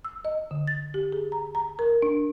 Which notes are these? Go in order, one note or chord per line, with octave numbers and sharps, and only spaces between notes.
E6
D#5
D3
A6
G4
G#4
A#5
A#5
A#4
D4